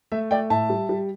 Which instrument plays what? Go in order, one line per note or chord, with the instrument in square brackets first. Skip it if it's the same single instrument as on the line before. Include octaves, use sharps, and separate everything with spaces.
[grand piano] A3 E5
A3 D5 G5
A2 E5 A5
G3
G3